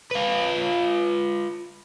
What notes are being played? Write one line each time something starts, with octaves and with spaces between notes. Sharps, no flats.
F4 B4